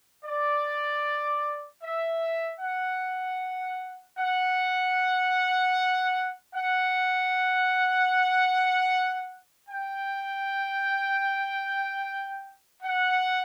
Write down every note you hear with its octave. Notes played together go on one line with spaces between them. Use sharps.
D5
E5
F#5
F#5
F#5
G5
F#5